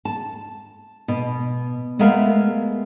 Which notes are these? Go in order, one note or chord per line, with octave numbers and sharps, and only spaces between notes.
A5
B2
G#3 A3 B3 A#4 E5 F5